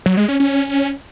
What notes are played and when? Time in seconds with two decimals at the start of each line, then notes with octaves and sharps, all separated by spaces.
0.06 F#3
0.17 G#3
0.29 C#4
0.40 C#4